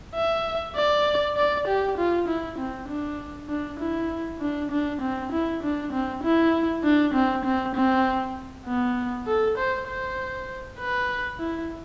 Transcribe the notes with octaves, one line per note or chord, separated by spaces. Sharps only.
E5
D5
D5
G4
F4
E4
C4
D4
D4
E4
D4
D4
C4
E4
D4
C4
E4
D4
C4
C4
C4
B3
A4
C5
C5
B4
E4